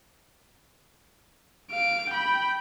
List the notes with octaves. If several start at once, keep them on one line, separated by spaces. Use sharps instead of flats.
F5 D7
G5 B5